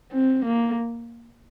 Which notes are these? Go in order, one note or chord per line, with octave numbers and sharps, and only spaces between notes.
C4
A#3